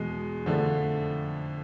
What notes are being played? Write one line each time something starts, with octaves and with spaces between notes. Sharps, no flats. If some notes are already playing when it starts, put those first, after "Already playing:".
Already playing: E2 B2 G#3
F2 D3 F3 A3